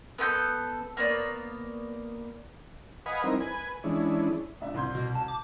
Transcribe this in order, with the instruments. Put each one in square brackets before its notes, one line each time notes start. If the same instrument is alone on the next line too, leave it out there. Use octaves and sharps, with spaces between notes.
[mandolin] B3 A4 B5 G6
A#3 B3 C#5 D5
[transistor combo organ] B4 D#5 F5 F#5 G#5 B5
G3 C4 D#4 E4 A#4
B4 G#5
E3 G#3 C#4 D4 E4
[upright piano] C#2 D4 E5
C2 C6 G6
[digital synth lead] B2
A5
D6